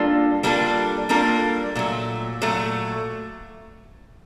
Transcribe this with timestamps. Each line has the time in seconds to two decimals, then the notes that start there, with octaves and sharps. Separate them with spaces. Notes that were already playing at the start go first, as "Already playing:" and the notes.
Already playing: G3 A#3 D4 F4 A4
0.43 G3 A#3 D4 F4 A4
1.09 G3 A#3 D4 F4 A4
1.75 A#2 F#3 A3
2.42 A#2 F#3 A3